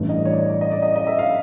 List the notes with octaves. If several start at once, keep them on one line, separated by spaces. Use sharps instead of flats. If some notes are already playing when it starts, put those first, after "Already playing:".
Already playing: A1 G2 E3 A3
D#5
D5
C#5
D5
C#5
D5
D#5
D5
D#5
D#5
E5
F5